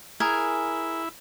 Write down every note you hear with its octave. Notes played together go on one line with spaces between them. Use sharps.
E4 G#4 A#4 G#5